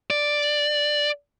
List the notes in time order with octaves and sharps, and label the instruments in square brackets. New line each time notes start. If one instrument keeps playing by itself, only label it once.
[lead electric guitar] D5